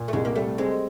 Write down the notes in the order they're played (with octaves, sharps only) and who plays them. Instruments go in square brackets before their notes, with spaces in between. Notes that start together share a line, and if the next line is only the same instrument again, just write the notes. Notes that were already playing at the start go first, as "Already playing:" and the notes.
Already playing: [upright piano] A#2
[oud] A3
[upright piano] C2 [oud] G#3
[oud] A#3
[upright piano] G3 [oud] A3
[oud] G#3 [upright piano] C4